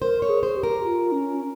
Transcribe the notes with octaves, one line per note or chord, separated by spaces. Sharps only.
A#4 C5
C#5
G#4
C5
G4
A#4
F4
C#4